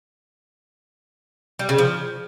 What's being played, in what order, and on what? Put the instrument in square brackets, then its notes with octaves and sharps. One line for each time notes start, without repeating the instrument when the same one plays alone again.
[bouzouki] G3
C#3
F3